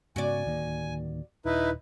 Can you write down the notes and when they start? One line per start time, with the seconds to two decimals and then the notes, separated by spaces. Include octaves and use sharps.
0.16 G#2 C#3 B3 F#4 D5 G#5
0.45 D1 D#3 A#3
1.45 D#1 D#4 E4 B4